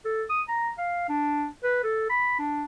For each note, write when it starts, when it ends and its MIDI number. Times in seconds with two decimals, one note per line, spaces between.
0.05 0.23 69
0.30 0.42 87
0.48 0.70 82
0.78 1.08 77
1.09 1.46 62
1.63 1.79 71
1.84 2.10 69
2.10 2.36 83
2.39 2.64 62